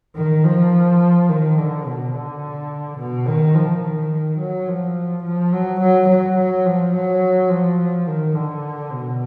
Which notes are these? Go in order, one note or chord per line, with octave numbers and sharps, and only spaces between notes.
D#3
F3
D#3
D3
B2
D3
B2
D#3
F3
D#3
F#3
F3
F3
F#3
F#3
F#3
F#3
F3
F#3
F3
D#3
D3
B2